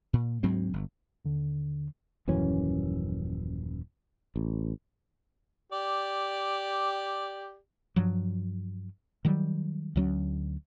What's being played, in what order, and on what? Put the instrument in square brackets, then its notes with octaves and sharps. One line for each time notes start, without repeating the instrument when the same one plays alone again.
[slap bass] A#2
D2 G#2 F#3 C4
G1
[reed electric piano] D#2 D3
[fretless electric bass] D#1 F#2 E3 C#4
A1
[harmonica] G4 D5
[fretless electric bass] G2 F3 F#3
D#3 F#3 G3
D2 F#3 C#4